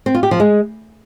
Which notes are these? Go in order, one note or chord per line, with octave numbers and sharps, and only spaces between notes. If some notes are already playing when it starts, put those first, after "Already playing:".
C4
F4
G4
F3
G#3